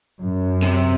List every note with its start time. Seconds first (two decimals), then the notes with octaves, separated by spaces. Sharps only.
0.21 F#2
0.62 C3